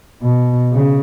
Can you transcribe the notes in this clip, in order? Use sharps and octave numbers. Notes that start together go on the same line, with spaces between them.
B2
C#3